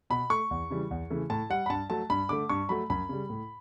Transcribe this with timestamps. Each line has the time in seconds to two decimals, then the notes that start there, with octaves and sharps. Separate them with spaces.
0.10 B2 B5
0.30 A3 C#6
0.51 E2
0.71 C#3 E3 G3
0.91 E2
1.10 C#3 E3 A3
1.30 A2 A5
1.50 G3 F#5
1.66 B5
1.70 G2 A5
1.90 F#3 A3 A5
2.10 G2 B5
2.29 D3 A3 D6
2.49 G2 C#6
2.69 F#3 A3 B5
2.90 F#2 B5
3.09 C#3 G3
3.30 A2